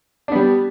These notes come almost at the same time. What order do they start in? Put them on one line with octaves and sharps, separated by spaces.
D4 B3 G3